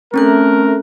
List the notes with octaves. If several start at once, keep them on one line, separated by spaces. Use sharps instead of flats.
A3 C4 C#4 A#4 F#6